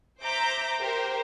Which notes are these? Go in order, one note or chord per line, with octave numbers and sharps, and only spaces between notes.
C5 E5 A#5 D6 G6
G4 A#4 C5